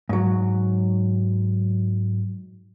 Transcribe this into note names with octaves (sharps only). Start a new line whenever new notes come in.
G#2 F#3